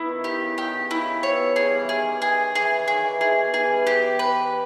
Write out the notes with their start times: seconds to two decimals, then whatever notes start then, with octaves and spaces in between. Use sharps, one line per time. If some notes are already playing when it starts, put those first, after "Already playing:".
Already playing: B3 E4
0.09 D#3
0.24 D#3 G4
0.42 C#3
0.57 D#3 G4
0.80 C#3
0.91 E4
1.01 C#3
1.23 B2 C#5
1.56 C#3 G#4
1.68 G3
1.78 E3
1.88 D#3 G#4
2.22 G#4
2.55 E3 G#4
2.71 C#3
2.88 D#3 G#4
3.05 E3
3.16 D#3 E3 G#4
3.37 B2
3.54 G#4
3.60 E3
3.70 G3
3.86 G#3 G4
4.19 B4